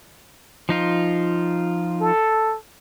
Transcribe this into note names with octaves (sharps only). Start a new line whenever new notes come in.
F3 D#4 F4
A4